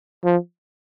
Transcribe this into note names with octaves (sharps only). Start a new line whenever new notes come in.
F3